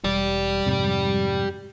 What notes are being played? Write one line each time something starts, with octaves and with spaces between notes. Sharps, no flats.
E1 G3 G4 D5
F2 G#2 C3